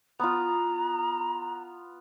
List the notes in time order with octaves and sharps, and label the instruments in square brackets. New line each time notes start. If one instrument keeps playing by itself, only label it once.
[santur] B3 F4 [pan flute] A#5